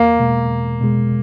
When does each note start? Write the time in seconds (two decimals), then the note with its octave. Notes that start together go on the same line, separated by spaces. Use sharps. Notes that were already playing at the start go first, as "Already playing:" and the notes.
Already playing: E2 A#3
0.19 B2 G#3
0.50 E2
0.81 B2 G#3